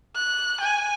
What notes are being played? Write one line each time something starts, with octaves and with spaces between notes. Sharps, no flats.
F#6
G#5